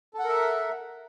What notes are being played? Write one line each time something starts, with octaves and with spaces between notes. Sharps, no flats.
A4 A#4 E5 F#5